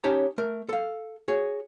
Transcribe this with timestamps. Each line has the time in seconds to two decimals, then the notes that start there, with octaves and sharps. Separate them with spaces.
0.04 C#4 D#4 G4 C#5 A5 A#5
0.38 A3 A#4
0.69 A4 F5
1.28 F#4 G#4 C#5